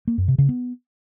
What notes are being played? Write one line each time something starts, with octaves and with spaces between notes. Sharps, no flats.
A#3
F#2
C3
C#3
B3